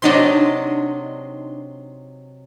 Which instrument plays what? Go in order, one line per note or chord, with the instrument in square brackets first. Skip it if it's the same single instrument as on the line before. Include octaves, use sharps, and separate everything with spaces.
[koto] C3 F#3 D#5 [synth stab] D4 D#4 C6